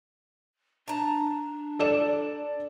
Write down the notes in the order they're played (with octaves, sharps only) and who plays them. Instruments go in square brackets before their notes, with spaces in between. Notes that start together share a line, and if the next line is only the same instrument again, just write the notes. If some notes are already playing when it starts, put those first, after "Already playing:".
[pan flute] D4 [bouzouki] A5 A#5
[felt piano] A4 D5 E7